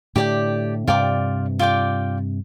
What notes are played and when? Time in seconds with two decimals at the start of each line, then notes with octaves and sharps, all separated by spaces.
0.16 A2 D3 G4 D5 G5
0.87 G2 C3 F4 D5 G5 D6
1.59 F4 D5 G5 D6